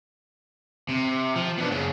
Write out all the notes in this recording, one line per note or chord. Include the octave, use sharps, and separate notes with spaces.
C3
F3
B2 D4
F#2 C#3